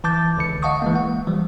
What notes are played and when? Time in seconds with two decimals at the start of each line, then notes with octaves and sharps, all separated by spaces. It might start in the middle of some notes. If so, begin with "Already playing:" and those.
0.04 E3 A5 D6 G6 A6
0.37 C#2 D3 C#7
0.62 D#5 F5 F#5 A5 C#6 D#6
0.82 E3 G#3 A#3
0.96 F#5
1.27 E3 F3 G3